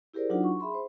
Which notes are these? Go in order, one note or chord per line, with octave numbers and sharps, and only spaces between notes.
E4 G4 G#4 A#4 C5 D5
F#3 D4 D#4 F4 F#4 F#5
C#6
G#4 E5 B5 C6
C5